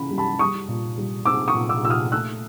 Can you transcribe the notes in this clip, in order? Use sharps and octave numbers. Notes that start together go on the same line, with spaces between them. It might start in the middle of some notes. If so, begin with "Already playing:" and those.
Already playing: C#3 E3 B5
G3
A5 B5
G3 C#6 D#6
A#2
G3
C4 D6 E6
C#6 D#6
A#2
D6 E6
A#2 E6
D#6 F6
A3 E6 F#6